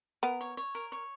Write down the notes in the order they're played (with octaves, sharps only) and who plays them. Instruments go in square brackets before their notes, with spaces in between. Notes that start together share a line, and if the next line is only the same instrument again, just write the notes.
[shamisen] B3 [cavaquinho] A#4
[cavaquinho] C#5
C#5
A#4
C#5